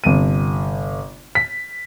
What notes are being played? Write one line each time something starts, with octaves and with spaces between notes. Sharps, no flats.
G1 C3 D#7
B6